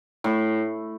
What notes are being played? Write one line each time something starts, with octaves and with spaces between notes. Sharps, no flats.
A2